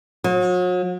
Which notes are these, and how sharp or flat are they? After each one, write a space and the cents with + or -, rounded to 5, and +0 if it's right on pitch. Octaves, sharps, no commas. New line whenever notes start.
F#3 -40